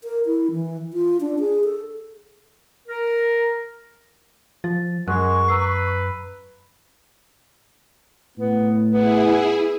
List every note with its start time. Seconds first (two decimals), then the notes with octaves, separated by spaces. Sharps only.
0.04 A#4
0.26 E4
0.51 E3
0.93 F4
1.20 D4
1.39 G#4
1.64 A4
2.88 A#4
4.64 F3 A6
5.08 F#2 G#3 A#4 F#5 C#6 F#6
5.48 B4 A#5 E6 C7
8.38 A2 B3
8.90 B3 E4 G#4